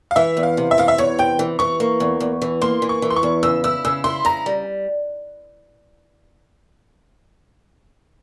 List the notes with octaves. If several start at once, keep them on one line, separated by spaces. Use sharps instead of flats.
F5
E3 E5
E2
F5
C3
E5
E3 F5
E5
E2 C#5
C3 G5
E3
E3 C#6
A#3
E2
E2
E3
A#3 C6
E3
C#6
E3
C6
C#6
E2
C#3 E6
E4 E6
C#3 E6
E4 C6
C#3 A#5
G3